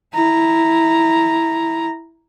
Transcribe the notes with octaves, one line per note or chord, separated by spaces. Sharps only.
E4 A#5